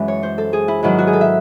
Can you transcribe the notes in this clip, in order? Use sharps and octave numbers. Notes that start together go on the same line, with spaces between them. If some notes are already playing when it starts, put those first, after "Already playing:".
Already playing: F#2 E3 G#3 C#4
C#5
C5
A4
G#4
E4
G#2 D#3 F#3 E4
F#4
G#4
A4
E5